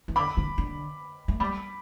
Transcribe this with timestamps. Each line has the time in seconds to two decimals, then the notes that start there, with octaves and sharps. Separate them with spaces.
0.08 E3
0.16 D3 B5 D6
0.37 D3
0.58 D3
1.28 A3
1.40 G3 B5 D6